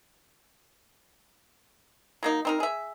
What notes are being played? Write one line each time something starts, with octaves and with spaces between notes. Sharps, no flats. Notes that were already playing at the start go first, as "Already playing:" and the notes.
F#3 A#3 D#4
C4 D#4 A#4
G#4 E5